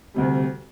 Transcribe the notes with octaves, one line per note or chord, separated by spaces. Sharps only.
D2 C3 G3